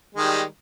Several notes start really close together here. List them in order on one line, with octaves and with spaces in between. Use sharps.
G#3 D#3 G3